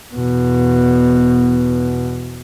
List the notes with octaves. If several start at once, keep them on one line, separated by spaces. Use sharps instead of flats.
E2 B2